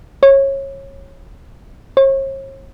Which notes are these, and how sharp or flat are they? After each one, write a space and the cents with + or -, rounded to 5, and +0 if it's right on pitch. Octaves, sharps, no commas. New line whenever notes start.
C#5 -25
C#5 -45